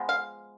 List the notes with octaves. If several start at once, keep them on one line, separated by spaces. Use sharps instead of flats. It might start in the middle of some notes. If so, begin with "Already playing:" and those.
Already playing: F3 G#3 B3
F5